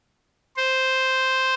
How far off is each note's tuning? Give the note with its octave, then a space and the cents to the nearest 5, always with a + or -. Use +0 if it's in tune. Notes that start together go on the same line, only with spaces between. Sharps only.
C5 +0